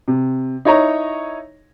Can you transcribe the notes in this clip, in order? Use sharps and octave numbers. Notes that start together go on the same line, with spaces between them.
C3
D#4 E4 C#5 D#5 A#5